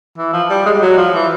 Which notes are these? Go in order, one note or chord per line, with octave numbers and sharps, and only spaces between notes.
E3
F3
G3
G#3
G3
F#3
F3
E3